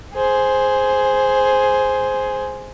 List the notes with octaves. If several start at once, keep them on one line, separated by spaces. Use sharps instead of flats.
G#4 C5